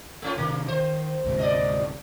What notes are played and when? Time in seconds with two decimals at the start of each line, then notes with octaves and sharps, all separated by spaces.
0.22 A3 C#4 F4
0.37 C3 D#3 A#3
0.68 D#3 C5
1.24 D2 G#2 C3
1.39 D5 D#5